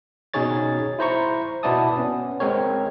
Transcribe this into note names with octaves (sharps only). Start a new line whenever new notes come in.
B2 C#4 D#4 G#4 C#5 A6
E4 C5 A#5 C#6
B2 B3 E4 D5 A5 D#6
B3 C#4
G#3 C4 A#4 C#5